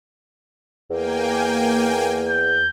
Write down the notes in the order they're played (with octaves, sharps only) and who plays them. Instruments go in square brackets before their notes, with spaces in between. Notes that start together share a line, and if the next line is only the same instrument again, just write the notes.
[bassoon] E2 [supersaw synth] A#3 G5 G#5
[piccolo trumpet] G6